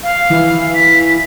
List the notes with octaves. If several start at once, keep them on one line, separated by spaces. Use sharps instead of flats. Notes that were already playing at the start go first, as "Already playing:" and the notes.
F5
E3
B6